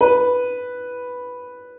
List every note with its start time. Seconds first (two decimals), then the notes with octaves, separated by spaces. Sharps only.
0.01 B4